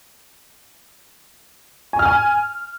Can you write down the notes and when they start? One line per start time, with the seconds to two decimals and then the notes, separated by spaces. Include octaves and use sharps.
1.93 G#5
1.99 F6
2.05 G#5